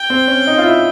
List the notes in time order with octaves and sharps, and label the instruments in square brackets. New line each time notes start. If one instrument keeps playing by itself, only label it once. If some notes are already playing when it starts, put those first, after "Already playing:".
Already playing: [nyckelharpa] G5
[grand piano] C4
C#4
D#4
F4
E4